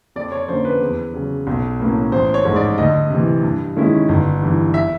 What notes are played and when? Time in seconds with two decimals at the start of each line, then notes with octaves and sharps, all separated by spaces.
0.16 F2 D5
0.32 C#5
0.48 D3 F3 A#3 C#4 C5
0.65 B4
0.81 E2
1.14 C#3 F#3
1.47 B1
1.80 A2 F#3 A#3 C#4
2.12 A1 C5
2.34 C#5
2.45 G#2 F3 G#3
2.56 D5
2.78 D2 D#5
3.10 C3 E3
3.43 G2
3.76 D#3 G#3 C#4 E4
4.09 G1
4.42 G2 E3
4.74 E5